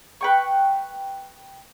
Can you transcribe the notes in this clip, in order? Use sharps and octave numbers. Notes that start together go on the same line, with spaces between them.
B4 G5 C#6